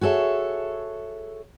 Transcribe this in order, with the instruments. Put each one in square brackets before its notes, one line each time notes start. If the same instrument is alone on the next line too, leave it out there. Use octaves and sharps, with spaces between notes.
[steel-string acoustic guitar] F#4 G#4 A4 C#5 E5